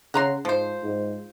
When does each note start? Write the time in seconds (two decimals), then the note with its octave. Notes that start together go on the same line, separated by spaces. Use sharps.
0.14 C#3 F#5 A#5 C6
0.45 G#2 F3 C5
0.83 G#2